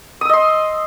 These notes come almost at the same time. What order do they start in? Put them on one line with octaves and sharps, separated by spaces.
D#6 E6 D#5 C6